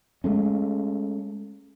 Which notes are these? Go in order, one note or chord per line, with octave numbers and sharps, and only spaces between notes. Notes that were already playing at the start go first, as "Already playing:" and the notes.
G#3 A3 C#4